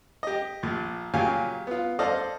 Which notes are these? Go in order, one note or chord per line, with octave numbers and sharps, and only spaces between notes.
G4 D#5
A#1 A#2
A#2 C#3 F#3 G4 F5 G#5
B3 F4
A4 C5 D5 D#5 F5